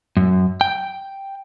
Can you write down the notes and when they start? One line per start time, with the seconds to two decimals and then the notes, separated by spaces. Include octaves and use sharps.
0.17 F#2
0.61 G5